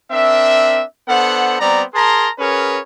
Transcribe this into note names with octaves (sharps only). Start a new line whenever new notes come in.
C4 D4 A#4 E5
B3 D4 A4 C5 F#5
G3 B3 C4 D5 A#5
G#4 A#4 A5 A#5 C6
C#4 F#4 G#4 A#4 B4 C#5